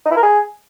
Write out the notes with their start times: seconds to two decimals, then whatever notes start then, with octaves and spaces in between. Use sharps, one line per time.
0.05 D#4
0.11 E4
0.17 A#4
0.22 G#4